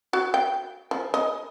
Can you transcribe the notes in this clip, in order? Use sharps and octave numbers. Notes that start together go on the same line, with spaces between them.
F#4
G5
F3
D#5